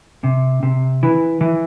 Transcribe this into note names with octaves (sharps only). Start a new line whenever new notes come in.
C3
C3
E3
E3